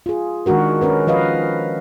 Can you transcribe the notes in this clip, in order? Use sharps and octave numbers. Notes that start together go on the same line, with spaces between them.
F4 G#4
D#3 G#3 D4 F#4 A#4
C#4 A#4 B4
F3 B4 D#5 F5